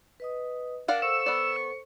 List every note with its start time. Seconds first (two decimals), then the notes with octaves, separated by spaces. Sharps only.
0.20 B4 D#5 D#6
0.88 D4 A#4 D5 F5 F#5
1.02 A4 C5 C#6 E6
1.26 B3 D5